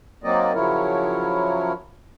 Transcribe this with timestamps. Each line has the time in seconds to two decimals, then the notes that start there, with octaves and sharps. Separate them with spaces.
0.24 F#3 A#3 C4 D#4 D5 D#5
0.54 C#3 F3 F#3 E4 A#4 C#5